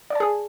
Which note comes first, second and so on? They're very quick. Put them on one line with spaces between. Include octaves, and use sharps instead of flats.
D5 A5 G#4